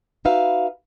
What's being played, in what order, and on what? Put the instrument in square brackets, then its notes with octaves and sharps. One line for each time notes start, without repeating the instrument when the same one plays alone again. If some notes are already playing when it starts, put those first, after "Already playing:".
[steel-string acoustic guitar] D#4 F#4 B4 E5 F5